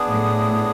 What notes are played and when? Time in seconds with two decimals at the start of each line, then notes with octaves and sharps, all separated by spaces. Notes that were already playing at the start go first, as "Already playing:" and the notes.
Already playing: B3 D4 G#4
0.09 A2